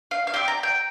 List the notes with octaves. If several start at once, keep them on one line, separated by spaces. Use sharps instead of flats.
F5
F5
C4 G4 G5
A#5
G5